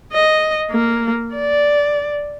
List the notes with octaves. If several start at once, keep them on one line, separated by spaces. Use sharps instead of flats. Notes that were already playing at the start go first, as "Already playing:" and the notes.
D#5
A#3
D5